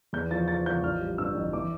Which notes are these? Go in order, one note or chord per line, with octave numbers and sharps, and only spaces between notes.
E2 G6
F3 A6
F3 A6
F3 G6
A1 F6
G3
G2 E6
A1
E3 D6